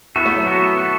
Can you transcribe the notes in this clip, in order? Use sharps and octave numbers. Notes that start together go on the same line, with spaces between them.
B3 E4 F#4 A4
A3
F#3
B3 F#4 A4
B3 F#4 A4